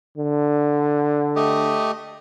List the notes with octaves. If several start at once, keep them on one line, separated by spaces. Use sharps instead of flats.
D3
A3 G4 D#5